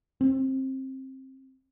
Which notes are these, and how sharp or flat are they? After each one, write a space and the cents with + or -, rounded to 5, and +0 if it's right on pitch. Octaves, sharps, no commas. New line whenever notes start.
C4 +20